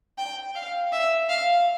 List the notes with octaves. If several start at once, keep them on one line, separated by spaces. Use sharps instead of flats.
G5
F5
E5
F5